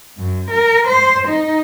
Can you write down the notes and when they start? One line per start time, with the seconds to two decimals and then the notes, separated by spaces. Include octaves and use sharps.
0.18 F#2
0.51 A#4
0.88 C5
1.29 D#4